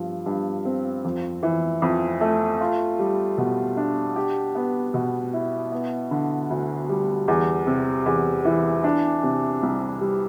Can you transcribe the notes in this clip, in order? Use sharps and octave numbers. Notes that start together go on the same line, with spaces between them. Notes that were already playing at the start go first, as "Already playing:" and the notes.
Already playing: G2 F3
G2
C4
F2
E3
F2
A3
F4
G3
B2
D4
G4
B3
B2
E4
B3
D3
D2
G3
E2
C3
E2
E3
D4
C3
C2
G3